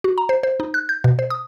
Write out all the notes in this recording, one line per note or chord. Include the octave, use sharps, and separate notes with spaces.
F#4
A#5
C5
C5
D#4
F#6
G6
B2
C5
D#6